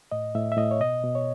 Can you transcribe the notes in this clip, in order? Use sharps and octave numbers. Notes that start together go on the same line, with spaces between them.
A2 D#5
A2 E5
E5
A2 D#5
C#5
B2 D#5
B2
C#5